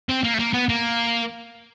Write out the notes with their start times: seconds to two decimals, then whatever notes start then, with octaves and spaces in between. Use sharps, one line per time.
0.09 C4
0.24 A#3
0.34 A3
0.39 A#3
0.53 B3
0.69 A#3